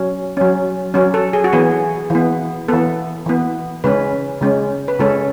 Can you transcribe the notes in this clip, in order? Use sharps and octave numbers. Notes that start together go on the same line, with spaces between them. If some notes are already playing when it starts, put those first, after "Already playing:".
Already playing: F#3 C#4
F#3 C#4
F#3 C#4
A4
G#4
F#4
E3 B3 G#4
E3 B3
E3 B3 A4
E3 B3
C#3 G#3 C#4 B4
C#3 G#3 C#4
B4
C#3 G#3 C#4 A4